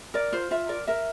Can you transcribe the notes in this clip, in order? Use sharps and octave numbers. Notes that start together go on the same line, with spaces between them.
A#4 D5
F4 C5
F4 E5
A#4 D5
A#4 E5